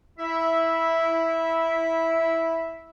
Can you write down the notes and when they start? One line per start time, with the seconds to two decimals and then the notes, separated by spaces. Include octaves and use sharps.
0.18 E4 E5